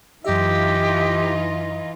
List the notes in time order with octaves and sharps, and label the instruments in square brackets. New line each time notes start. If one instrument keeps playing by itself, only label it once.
[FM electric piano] F#2 E5 [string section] E3 D#4 F4 [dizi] G4 [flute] D#5